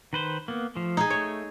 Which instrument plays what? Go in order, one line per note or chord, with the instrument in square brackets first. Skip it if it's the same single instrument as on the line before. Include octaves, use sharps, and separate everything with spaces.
[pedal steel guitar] D#3 B4 C5
A#3 B3
F3 A3
[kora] D#4 G#4
[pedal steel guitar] A3 [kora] C#5